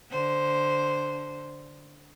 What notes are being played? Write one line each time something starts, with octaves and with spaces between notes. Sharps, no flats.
D3 C5